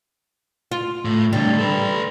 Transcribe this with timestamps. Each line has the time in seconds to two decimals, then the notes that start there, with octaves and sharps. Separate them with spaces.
0.71 F4
1.05 A2
1.33 A2 D3 G3
1.59 A4 B4